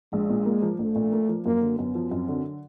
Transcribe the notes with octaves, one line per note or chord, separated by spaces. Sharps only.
A#1 G#3
A#2
A#3
F3
A#1 A3
A#2
A#3
F3
F#2 A#3
D3
F#2 B3
F3
F#2 C4
D3